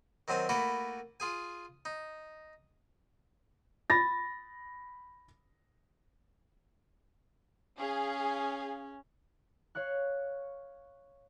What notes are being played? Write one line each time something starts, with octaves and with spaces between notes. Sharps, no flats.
D#3 F#3 C4 G#5 A5
A3 A#3 E4 F#4 A4 B4
F4 G#4 G#5
D#4
B5 A6 A#6
C#4 G#4 F5
C#5 F5 C#6 F#6